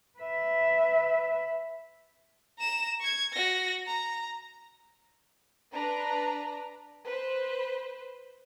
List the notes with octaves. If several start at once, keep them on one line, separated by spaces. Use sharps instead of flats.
B4 E5
A#5 E7
C#6 G#6
F#4 A#6
A#5
D4 B4 A#5
B4 C5